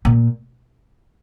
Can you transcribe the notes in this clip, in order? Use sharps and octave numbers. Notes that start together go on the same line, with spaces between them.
A#2